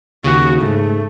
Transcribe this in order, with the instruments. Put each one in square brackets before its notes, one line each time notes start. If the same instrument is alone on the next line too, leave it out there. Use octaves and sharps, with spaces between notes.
[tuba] D#2 [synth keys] C#3 [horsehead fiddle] F#4
[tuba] G#2 [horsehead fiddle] A3